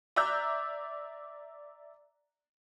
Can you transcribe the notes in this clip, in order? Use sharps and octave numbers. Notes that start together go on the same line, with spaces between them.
D5 E5 A#5 E6 F#6 G6